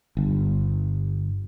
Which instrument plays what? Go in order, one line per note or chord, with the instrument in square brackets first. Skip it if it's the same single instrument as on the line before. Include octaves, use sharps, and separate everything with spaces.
[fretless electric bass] G1